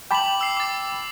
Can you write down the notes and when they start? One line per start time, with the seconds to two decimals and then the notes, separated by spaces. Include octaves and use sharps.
0.11 G5 A5 B5 D6 F#7
0.41 E6 C7
0.57 D6 A6